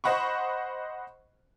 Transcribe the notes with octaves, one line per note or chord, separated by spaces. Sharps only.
C5 D#5 F#5 B5 C#6